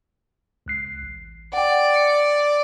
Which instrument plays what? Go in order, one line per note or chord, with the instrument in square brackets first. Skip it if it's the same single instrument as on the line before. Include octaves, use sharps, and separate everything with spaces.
[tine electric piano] C#2 F#6 C7
A1
[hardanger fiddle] D5 [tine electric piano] F#5 G5
[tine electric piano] C#7